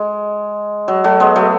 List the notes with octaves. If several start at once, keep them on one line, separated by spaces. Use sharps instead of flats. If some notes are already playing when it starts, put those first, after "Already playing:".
Already playing: G#3
F#3
F#3 A3
G#3 B3
F#3 A3